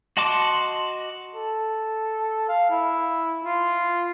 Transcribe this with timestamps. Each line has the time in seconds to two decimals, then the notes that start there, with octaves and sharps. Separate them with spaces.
0.17 F#4 D#5 A5 C6 D6
1.35 A4
2.48 F5
2.70 E4
3.45 F4